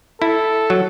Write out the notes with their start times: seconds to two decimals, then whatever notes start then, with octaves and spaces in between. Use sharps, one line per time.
0.21 E4 A4
0.70 F#3